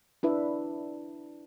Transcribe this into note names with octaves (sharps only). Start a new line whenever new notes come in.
D4 E4 B4 E5